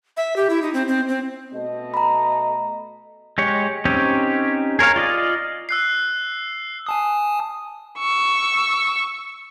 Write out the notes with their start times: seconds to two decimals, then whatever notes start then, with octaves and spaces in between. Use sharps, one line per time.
0.17 E5
0.36 G4
0.50 E4
0.62 D#4
0.74 C4
0.88 C4
1.09 C4
1.52 B2 A3 D#5
1.94 A#5 B5
3.38 G#3 G4 C#5
3.85 C4 C#4 D#4 G4 C#5
4.79 G#4 A#4 C#5 F5
4.96 F4 D5 D#5 F5
5.69 E6 F#6 C7
6.86 G#5 A5 D#6
7.98 C#6 E6